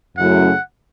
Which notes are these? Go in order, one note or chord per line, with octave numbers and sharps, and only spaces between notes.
F#2 C#3 F#3 A3 E4 F#5